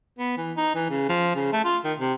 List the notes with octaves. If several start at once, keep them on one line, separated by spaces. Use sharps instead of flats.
B3
E3
D#4
E3
C#3
F3
C#3
A3
F4
D#3
C3